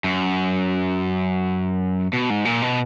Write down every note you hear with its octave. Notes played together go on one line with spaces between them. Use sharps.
F#2
B2
G#2
A#2
B2